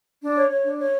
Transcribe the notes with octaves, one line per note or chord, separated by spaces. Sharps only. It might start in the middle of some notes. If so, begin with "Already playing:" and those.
D4
C#5
C#5
D4
C#5